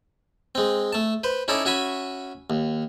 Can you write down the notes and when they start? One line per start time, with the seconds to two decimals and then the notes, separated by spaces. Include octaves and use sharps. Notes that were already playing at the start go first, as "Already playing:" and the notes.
0.55 G#3 C4
0.93 A3 A5
1.24 B4 C5
1.48 C#4 D#4 E4 A4 C#5 D5
1.65 C#4 F#4 E5 G#5 B5
2.50 D#2